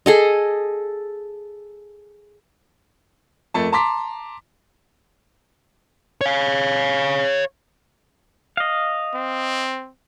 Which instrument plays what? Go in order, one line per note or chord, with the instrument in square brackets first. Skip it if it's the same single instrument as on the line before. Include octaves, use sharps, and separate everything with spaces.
[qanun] G#4 A4 D#5
[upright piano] F2 A3 A#3 A5
A5 A#5 C6 D6 B6
[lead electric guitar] C#5 F5
[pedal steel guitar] D#5 F5
[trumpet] C4